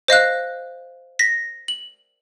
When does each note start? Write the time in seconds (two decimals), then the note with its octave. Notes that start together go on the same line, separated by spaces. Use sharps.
0.08 C5 D#5 F5 F#6
1.19 A#6 B6
1.68 F#7